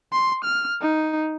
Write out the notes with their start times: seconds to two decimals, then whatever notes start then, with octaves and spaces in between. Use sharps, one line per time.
0.12 C6
0.44 F6
0.81 D#4